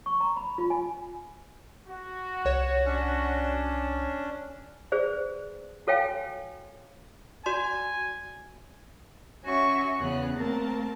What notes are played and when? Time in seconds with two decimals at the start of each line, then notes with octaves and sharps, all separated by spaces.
0.06 C#6
0.21 A#5
0.37 B5
0.58 F4
0.70 G#5
1.87 F#4
2.45 C2 C#5 E7
2.86 C#4 D4
4.92 G#4 B4 C5 D5
5.87 F#4 A4 C#5 F5 G5 G#5
7.46 F#4 D5 G#5 C6
9.45 C#4 F#4 E5 G#5 C#6
9.98 E2 C#3 B3 G#4 F#6
10.36 A3 A#3 C4 A#4 A5